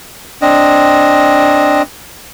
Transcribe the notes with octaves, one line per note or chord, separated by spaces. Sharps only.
C4 D4 D#5